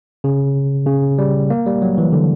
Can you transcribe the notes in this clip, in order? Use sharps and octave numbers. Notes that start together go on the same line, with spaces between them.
C#3
C#3
G3
A#3
G3
F#3
E3
D3